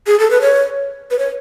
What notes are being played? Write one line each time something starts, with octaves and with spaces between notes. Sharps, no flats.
G#4
A4
B4
C#5
B4
C#5